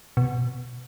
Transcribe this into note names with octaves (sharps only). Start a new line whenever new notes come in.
B2